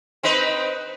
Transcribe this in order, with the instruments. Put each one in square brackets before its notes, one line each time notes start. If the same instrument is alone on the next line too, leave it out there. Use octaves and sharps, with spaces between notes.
[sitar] C4 D#4 B4